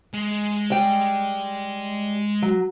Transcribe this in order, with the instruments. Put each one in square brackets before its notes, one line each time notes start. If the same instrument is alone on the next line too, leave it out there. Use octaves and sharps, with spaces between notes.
[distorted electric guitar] G#3
[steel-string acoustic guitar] G3 G5
F#3